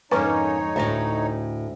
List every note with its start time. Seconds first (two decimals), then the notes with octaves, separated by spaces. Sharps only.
0.11 F2 G#2 D3 A#3 C#4 D#4 B4 C#5
0.76 D2 A2 D#5 E5 A#5